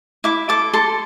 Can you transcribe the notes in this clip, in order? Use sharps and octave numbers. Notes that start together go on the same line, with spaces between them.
E4 D6
A4 D6
A4 C6